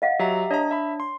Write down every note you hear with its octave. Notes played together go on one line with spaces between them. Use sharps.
D#5 F5 F#5
F#3 G4 E5 A#5
D4 C#5 D#5 A#5
E5 B5
C6